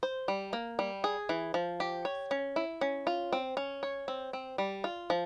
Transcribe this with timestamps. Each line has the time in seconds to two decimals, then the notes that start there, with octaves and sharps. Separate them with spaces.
0.03 C5
0.28 G3
0.53 A#3
0.79 G3
1.04 G#4
1.29 E3
1.54 F3
1.80 G4
2.05 C#5
2.31 C#4
2.56 E4
2.81 C#4
3.07 F4
3.33 C4
3.57 C#4
3.83 C#5
4.08 C4
4.33 C4
4.58 G3
4.84 F4
5.10 F3